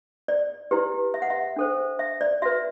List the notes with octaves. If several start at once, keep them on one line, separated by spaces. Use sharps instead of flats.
D5
E4 G4 B4
E5
F#5
E5
D4 A4 C5
E5
D5
F#4 B4 E5